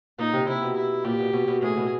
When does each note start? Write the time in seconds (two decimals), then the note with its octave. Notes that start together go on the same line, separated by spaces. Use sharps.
0.18 A#2 D#4
0.33 C3
0.48 C3 E4
0.62 B2
0.76 E4
1.05 A#2 G4
1.19 B2
1.33 B2
1.47 B2
1.62 A2 G#4
1.77 B2